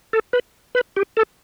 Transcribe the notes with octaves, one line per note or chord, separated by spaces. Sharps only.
A4
B4
B4
G4
A4